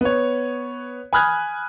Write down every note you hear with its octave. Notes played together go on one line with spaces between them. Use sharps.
B3 C#5
G#5 B5 D#6 F6 F#6 G#6